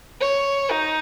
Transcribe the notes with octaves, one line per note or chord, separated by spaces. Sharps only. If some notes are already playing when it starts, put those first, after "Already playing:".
C#5
D#4